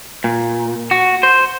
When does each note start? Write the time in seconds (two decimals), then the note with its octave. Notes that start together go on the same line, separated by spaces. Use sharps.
0.24 A#2
0.91 F#4
1.23 C5